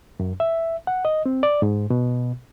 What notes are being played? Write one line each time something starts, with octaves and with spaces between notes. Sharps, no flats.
F#2
E5
F#5
D#5
C4
D5
G#2
B2